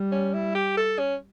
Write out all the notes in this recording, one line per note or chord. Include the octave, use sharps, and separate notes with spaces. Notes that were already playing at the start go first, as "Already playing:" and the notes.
Already playing: G3
C#4
E4
G4
A4
C#4